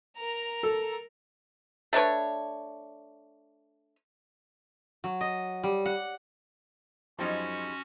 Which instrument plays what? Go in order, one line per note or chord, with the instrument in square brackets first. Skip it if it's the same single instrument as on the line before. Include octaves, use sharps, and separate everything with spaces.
[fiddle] A#4 A#5
[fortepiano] A4
[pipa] A3 D4 B4 C#5
[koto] F#3
D#5
G3
F#5
[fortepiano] F#2 F3 [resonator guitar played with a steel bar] G3 G#3 D#4 [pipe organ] C#4 F#4